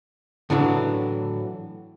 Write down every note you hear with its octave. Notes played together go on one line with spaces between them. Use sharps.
A2 D3 E3 F#3 D4